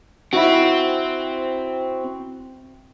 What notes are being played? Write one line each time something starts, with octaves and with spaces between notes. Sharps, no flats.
C4 E4 F#4